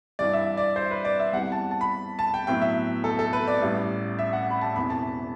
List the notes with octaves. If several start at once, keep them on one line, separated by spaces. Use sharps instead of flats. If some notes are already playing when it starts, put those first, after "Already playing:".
G2 E3 G3 D5
E5
D5
C5
B4
D5
E5
E2 C3 E3 G3 F#5
F#5
A5
A5
B5
A5
G5
A2 F#3 B3 E4 G5
E5
A4
A4
B4
D5
A1 A2 G3
E5
F#5
B5
A5
E1 E2 C3 E3 B5
A5